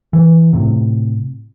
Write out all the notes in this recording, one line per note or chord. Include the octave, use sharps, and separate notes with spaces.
E3
A2 C3